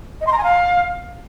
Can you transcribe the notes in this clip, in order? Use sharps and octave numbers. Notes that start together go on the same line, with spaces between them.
D#5
C6
A#5
G#5
F5